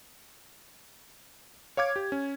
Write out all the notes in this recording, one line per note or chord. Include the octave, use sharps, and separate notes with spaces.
C#5 F5 D6 G#6
G4
C#4